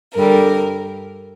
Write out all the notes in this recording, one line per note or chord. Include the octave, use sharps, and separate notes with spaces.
G2 D3 G3 A#4